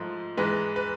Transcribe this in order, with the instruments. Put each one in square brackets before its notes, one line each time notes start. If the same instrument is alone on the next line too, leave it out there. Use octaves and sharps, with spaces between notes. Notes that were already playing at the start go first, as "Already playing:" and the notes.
Already playing: [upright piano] G#2 F3 A3
G#2 E3 G#3 B4
B4